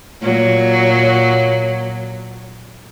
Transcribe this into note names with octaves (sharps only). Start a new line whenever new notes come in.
A#2 F#3